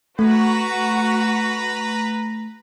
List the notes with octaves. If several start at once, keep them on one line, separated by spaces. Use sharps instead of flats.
A3 F#4 B4 A#5 B5